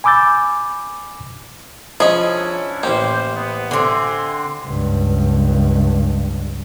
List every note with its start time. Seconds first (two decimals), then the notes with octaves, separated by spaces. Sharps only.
0.04 G#5 B5 D6 E6 G6 A6
2.00 F3 C#4 D4 E4 G#4 D#5 B5
2.83 A1 A#3 G4 C5
3.35 B3
3.71 D3 C4 E5 G#5 C6
4.65 C#2 G2